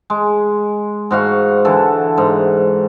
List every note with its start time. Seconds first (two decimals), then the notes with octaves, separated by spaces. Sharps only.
0.10 G#3
1.11 G#2 F#4 F5 C#6
1.65 D3 E3 A4
2.17 G#2